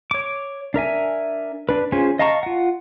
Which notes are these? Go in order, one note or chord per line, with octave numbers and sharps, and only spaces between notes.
C#5 D6
D4 A#4 E5 G#5
D4 B4
C#4 F4 G#4 C5
D#5 F5 A5 A#5 C#6
F4 F#5